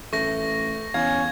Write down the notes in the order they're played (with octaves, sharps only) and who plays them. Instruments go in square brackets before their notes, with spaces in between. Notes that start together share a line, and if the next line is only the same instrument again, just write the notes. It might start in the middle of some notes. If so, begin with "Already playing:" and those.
[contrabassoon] A1 [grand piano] A3 [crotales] C#6 A#6
[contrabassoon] E2 [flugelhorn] C#4 [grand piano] F5 [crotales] G#6